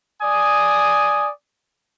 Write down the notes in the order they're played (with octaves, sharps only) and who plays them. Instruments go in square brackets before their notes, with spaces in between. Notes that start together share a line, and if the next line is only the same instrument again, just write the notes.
[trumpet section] D5 G#5 D#6